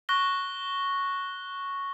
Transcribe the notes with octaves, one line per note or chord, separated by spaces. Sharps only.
C#6 F#6 A#6 G7